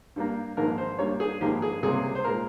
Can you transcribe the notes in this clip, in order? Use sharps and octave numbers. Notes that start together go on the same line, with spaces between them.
G2 G3 A#3
A#1 G#2 D#3 A#3 A#4
C5
G2 G3 A#3 C#5
G#4
A#1 G#2 D#3 A#3 G4
G#4
C#2 C3 G3 A#3 G#4
C5
A#2 G#3 A#4